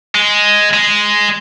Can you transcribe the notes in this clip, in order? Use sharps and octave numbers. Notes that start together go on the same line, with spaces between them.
G#3
G#3